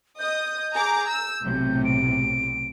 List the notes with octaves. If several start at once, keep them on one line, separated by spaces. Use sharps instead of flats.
D#5 D#6 G6
G#4 A#5 D6
E6
B1 A2 C3
D7